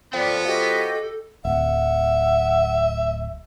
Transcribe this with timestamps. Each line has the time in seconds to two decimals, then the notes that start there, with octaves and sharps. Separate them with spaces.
0.13 F3 B3 A4 D5 F5 G5
0.45 F#4 G4 A4 D#5
1.45 D1 E5 F#5